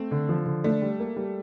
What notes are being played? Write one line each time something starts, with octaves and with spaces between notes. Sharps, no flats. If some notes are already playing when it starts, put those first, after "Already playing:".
Already playing: A3 C4
D3
F3
D3
A3 D4
G3
A#3
G3